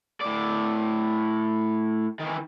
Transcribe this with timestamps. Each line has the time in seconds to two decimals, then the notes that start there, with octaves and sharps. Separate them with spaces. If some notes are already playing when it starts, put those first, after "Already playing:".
0.22 A2 D5
2.19 D#3 E3